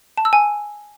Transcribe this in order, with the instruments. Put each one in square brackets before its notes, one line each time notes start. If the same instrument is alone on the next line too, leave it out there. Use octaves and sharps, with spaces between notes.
[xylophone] A5
E6
G#5